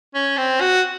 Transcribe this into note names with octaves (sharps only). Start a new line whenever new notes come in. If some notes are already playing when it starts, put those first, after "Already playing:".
C#4
C4
F#4